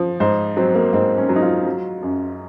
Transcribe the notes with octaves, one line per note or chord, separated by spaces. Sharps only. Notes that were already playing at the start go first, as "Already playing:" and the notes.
Already playing: F3
G#2 C5
F#3 C4
A#3
G#2 C4
C#4
F#3
D#4
F4
F#3
F#2